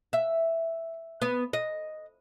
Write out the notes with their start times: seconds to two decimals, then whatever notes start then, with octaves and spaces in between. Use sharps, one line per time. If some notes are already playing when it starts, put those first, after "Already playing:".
0.13 E5
1.22 B3
1.53 D#5